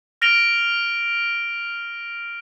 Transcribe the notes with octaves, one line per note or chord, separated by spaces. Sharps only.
F6 A#6 D7 F7 G7